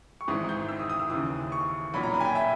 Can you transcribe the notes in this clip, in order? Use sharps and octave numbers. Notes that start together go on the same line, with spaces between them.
C#6
G#1 G#2 E3 D#6
G6
E6
D#6
D#6
E6
D#2 C#3 E3 D#6
C#6
B1 A#2 B5
A#5
B5
G#5
G5
E5